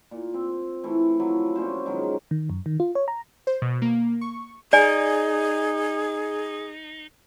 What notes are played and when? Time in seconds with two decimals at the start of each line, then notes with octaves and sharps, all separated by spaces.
0.11 A#2
0.34 C4
0.84 E3 A3
1.20 F3 F#3 E4
1.56 A#2 C#4 C5
1.86 D#3 F3 F#3 G#3
2.31 D#3
2.50 F#2
2.66 D#3
2.80 F4
2.95 C#5
3.08 A#5
3.47 C5
3.62 B2
3.82 A#3
4.21 C#6
4.73 D#4 G#4 D5 G#5